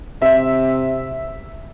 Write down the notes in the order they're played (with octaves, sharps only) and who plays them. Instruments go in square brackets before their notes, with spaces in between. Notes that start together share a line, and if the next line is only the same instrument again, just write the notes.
[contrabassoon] C3 [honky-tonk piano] E5